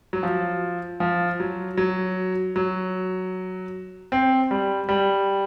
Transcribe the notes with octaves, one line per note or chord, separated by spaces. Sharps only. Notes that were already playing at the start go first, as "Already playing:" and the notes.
F#3
F3
F3
F#3
F#3
F#3
C4
G3
G3